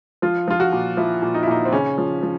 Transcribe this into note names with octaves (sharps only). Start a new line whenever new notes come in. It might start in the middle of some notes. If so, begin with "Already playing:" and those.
F3 F4
F3 F4
F#4
A#2
F3 E4
A#2
D#4
E4
A#2 D#4
C4
C#3 C#4
F3
F3